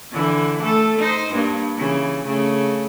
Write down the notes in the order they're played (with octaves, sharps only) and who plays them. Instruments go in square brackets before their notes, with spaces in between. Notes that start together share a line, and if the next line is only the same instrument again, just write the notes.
[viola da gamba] D3 E3
A3 A4
D#4 C5
G2 A#3
C#3 E3
C#3 A3